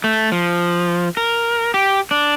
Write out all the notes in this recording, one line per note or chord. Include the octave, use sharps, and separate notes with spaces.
A3
F3
A#4
G4
D4